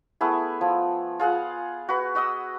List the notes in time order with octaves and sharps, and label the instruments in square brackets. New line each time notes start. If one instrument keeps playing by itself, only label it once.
[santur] A3 B3 E4 G#4
F3
F4 G#4 F5 F#5
F#4 B4
F#4 D#5 D#6 E6